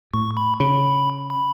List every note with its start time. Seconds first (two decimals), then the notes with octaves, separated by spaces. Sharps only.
0.13 A2 C#6
0.37 B5
0.60 C#3 B5
1.30 B5